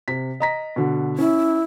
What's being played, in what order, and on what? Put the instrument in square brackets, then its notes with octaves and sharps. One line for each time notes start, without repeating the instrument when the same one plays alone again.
[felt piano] C3 B6
D#5 A#5 B6
B2 D3
[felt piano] C#4 [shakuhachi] E4